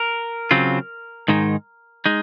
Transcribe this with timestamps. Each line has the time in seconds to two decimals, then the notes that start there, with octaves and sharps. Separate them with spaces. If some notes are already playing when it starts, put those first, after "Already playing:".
Already playing: A#4
0.51 C#3 F#3 C4 F4
1.28 G#2 D#3 G#3 D#4
2.06 G#3 D#4